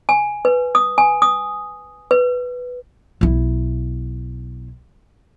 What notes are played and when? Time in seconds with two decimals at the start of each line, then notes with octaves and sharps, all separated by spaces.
0.09 G#5
0.45 B4
0.75 D#6
0.98 G#5
1.22 D#6
2.11 B4
3.21 B1 E4